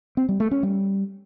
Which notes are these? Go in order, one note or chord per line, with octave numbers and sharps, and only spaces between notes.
C4
G3
A3
C#4
G3